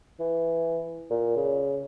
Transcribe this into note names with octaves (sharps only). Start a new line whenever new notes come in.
E3
A#2
C#3